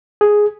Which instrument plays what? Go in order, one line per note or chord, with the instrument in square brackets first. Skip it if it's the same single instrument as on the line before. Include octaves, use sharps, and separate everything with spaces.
[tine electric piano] G#4